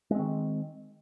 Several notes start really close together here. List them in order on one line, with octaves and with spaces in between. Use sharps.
G#3 C4 D#3